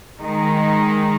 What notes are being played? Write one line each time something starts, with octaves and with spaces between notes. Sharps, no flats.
D#3 G#3 D#4